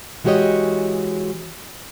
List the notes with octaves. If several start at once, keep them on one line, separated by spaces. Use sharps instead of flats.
E3 G#3 F#4 G4 C#5 D#5